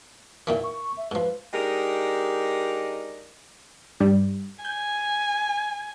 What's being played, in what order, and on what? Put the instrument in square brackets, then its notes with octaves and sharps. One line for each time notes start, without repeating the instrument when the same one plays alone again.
[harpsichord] A#2 D#3 E3 [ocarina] E5
[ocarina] C#6
E5
[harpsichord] G#2 F3 [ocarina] B4
[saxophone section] G#3 D4 D#4 G4 A#4
[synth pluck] G2 G3
[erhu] G#5 [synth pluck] G6